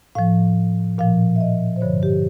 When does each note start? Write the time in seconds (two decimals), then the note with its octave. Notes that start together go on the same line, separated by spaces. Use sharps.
0.15 A2 F3 F5
0.98 A#2 F3 F5
1.36 E5
1.41 D#5
1.76 C5
1.81 G2 D3 F3 C#5
2.03 G4